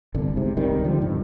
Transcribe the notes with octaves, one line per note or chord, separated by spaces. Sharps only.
G1 C2 D3
G#2 C3
C#2 C3 D#3 G3
D3 F3 G3
C2 G2